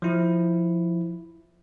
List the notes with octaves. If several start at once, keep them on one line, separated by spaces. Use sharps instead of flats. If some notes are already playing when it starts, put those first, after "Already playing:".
F3 E4